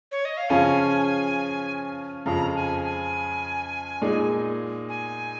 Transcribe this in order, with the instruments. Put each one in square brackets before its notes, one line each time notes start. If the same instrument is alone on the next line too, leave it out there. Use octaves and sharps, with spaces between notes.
[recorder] C#5
D#5
F5
[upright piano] C#3 F3 C#4 F4 [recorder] G#5
[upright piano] F2 C#3 F3 [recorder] A#5
[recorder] G#5
G#5
[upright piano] A#2 G#3 D#4
[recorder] G#5